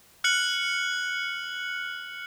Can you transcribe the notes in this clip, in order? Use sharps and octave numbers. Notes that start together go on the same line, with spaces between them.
F6 F#6 C#7 F#7